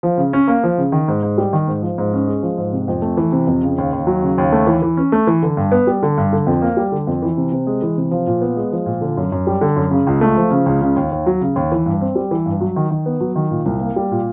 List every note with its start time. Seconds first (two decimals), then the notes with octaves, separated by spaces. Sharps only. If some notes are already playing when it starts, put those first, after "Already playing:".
0.03 F3
0.18 C#3
0.33 C#4
0.48 A#3
0.64 F3
0.78 C#3
0.92 D#3
1.08 G#2
1.23 G#2
1.38 G3
1.53 D#3
1.68 G#2
1.82 F3
1.98 G#2
2.13 C#4
2.28 G#3
2.43 F3
2.58 G#2
2.73 C3
2.88 F2
3.02 A3
3.17 E3
3.32 C3
3.47 F2
3.62 C#3
3.78 D#2
3.93 D#2
4.07 F#3
4.22 C#3
4.38 D#2
4.52 A3
4.67 E3
4.82 E3
4.97 C#4
5.12 A3
5.27 E3
5.43 D3
5.57 G2
5.72 B3
5.87 G3
6.03 D3
6.18 G2
6.33 D3
6.47 F2
6.62 A#3
6.77 G3
6.92 D3
7.07 F2
7.22 E3
7.37 C3
7.52 C3
7.67 G#3
7.82 E3
7.97 C3
8.11 F3
8.27 A#2
8.41 B3
8.57 G#3
8.72 F3
8.86 A#2
9.01 D3
9.17 F#2
9.32 F#2
9.47 G3
9.61 D3
9.76 F#2
9.91 C#3
10.07 C#2
10.21 A3
10.37 F3
10.51 C#3
10.66 C#2
10.81 C#3
10.96 D#2
11.11 D#2
11.26 F#3
11.41 C#3
11.56 D#2
11.72 E3
11.86 G2
12.01 C4
12.15 G3
12.31 E3
12.46 G2
12.61 F#3
12.76 D#3
12.91 D#3
13.06 B3
13.20 F#3
13.36 D#3
13.51 A#2
13.66 C2
13.81 A#3
13.96 G3
14.11 A#2